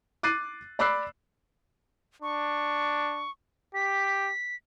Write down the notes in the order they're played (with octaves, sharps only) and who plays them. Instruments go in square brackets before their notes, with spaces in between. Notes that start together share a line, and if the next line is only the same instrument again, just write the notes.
[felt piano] D6 F#6 A6 C7 D#7
D5 B5 D6 E6 F#6 C7
[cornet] D4 [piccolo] C#6
[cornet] G4 [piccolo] B6